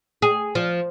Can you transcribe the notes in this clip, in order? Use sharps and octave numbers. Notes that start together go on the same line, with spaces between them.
G#4
F3